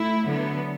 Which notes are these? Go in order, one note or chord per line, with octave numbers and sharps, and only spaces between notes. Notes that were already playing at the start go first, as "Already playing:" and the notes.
Already playing: A3 E4
D3 F#3 B3